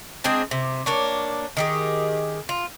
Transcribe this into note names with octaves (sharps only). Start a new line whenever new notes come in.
G#3 C4 D4 G#4
C3
A#3 D4 C#5
D#3 G4 G#4
F4